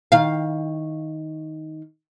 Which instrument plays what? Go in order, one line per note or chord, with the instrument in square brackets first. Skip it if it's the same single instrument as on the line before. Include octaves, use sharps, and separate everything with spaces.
[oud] D#3 F5